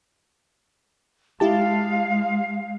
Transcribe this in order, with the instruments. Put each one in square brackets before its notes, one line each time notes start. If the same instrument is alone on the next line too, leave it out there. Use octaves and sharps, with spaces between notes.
[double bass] G#3 [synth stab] E4 G4 A5 [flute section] F5